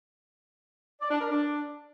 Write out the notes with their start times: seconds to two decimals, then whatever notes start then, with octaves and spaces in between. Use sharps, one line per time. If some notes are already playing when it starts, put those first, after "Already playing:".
1.01 D5
1.11 D4
1.21 A#4
1.31 D4